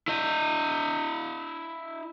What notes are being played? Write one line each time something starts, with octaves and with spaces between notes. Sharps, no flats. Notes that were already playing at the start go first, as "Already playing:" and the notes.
E4 D#5